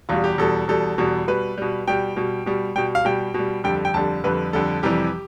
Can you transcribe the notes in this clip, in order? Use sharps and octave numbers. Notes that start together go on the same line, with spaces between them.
E2 B2 G3 F4
G4
E2 B2 G3 A4
E2 B2 G3 A4
E2 B2 G3
B2 G3 B4
B2 G3
B2 G3 G5
B2 G3
B2 G3
B2 G3 G5
F5
B2 G3 G5
B2 G3
F2 D3 G3 G5
G5
F2 D3 G3 A5
F2 D3 G3 B4
F2 D3 G3 A4
F2 C3 E3 G3 G4